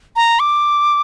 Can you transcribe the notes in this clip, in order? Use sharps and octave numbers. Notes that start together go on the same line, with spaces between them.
A#5
D6